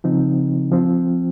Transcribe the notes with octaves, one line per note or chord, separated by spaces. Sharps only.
C#3 F3 C4 D#4
F3 C4 F4